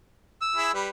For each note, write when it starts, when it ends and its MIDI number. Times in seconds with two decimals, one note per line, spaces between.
0.41 0.72 88
0.56 0.71 64
0.56 0.71 68
0.74 0.89 55
0.74 0.89 71